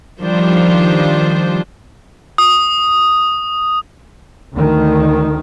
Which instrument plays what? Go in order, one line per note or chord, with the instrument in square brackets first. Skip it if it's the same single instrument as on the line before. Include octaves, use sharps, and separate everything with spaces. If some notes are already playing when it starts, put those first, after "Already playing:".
[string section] D#3 F3 G3 D4 F4 C5
[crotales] D#6
[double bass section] D2 D#3